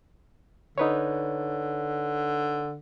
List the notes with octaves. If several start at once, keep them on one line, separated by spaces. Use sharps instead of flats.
D3 D#4 B4 C#5